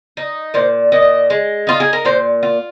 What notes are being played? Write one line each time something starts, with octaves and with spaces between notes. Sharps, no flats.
D#4
A#2 C5
A#2 D#5
G#3
D#4 F4
G#4
A#4
A#2 C5
F4